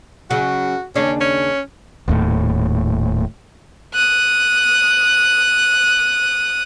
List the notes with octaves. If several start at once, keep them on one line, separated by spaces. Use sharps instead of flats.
C#3 F#3 F#4
D#2 C#3 C#4 D4
C#4
D#1 D#2 A2
D#6 F#6